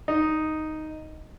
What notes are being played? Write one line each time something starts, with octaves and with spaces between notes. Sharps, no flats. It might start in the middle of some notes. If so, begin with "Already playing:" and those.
D#4